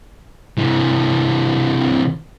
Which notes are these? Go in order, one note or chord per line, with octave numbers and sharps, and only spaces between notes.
C3 E3